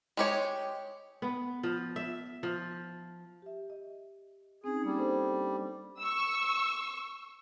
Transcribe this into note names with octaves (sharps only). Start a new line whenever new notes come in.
G#3 G4 C#5
B3
F3
E5
F3
G4 E5
D#5
C4 C#4 D#4 G#4
G3 A#3
D4 A4 C5
C#6 E6